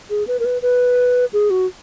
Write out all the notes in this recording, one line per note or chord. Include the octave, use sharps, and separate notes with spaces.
G#4
B4
A#4
B4
B4
G#4
F#4